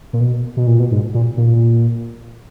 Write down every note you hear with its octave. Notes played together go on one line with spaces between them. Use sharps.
A#2
B2
B2
A#2
B2
G#2
A#2
A#2